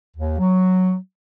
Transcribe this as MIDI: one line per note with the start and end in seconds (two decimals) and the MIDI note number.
0.16 0.35 39
0.38 0.95 54